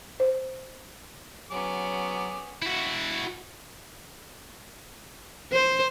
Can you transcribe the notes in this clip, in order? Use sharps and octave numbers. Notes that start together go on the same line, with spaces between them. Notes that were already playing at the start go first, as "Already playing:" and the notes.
C5
F#3 B3 C#4 G#4 D6
E4 F#4
C5